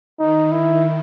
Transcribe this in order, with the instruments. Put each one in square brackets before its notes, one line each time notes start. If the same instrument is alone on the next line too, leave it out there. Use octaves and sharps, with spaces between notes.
[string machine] D#3 [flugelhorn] D#4
[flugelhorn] E4